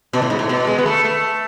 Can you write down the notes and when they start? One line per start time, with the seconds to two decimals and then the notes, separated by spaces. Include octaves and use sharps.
0.13 B2
0.22 A2
0.30 G#2
0.39 A2
0.49 B2
0.67 G#3
0.78 B3
0.86 A3
1.04 A3